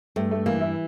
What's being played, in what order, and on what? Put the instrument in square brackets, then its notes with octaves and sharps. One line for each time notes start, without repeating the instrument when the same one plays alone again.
[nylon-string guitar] G2 [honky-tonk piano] A3
[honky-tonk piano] A3
[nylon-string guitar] E3 [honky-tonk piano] A#3
[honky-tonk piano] E4